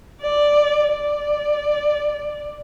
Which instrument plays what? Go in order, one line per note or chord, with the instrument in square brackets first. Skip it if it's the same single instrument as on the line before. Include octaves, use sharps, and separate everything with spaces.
[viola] D5
D5